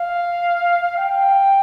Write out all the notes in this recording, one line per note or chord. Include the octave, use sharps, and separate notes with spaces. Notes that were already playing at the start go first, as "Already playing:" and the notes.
Already playing: F5
G5